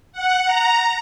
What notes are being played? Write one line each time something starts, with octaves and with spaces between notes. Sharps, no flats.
F#5
A#5